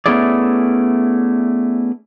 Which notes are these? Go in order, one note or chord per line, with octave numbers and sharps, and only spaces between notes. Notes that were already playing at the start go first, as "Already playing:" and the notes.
A3 B3 C#4 E4 G#4 D5